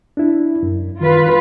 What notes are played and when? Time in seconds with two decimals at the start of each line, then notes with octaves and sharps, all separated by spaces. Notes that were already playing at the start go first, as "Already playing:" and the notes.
0.17 D4 E4
0.63 F#2
1.01 D#3 F4 B4